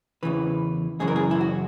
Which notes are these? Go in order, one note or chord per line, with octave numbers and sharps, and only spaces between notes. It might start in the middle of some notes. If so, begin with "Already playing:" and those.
E2 C#3 E3 B4
F#2 C#3 E3 G#4
A#4
G#4
E4
F#4